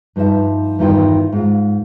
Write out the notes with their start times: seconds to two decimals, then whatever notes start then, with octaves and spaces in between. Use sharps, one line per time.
0.16 G2 F3 D#4 A#4 E5
0.79 E2 G2 D#3 E4 F4 G5
1.32 G#2 F4